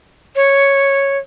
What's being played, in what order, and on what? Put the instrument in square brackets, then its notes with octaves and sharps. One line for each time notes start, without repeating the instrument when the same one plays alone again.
[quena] C#5